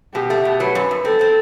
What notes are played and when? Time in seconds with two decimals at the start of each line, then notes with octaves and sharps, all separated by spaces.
0.15 B2 G4
0.30 A3
0.45 B2
0.60 F#3 B4
0.75 F#2
0.91 F#2
1.05 C4 A4
1.21 C4